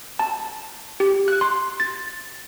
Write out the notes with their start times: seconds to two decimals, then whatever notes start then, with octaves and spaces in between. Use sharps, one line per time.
0.19 A5
1.00 G4
1.28 F#6
1.41 C6
1.80 A6